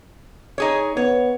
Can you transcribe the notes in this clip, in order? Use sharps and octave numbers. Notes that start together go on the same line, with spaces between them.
D#4 G#4 C#5
B3 C#5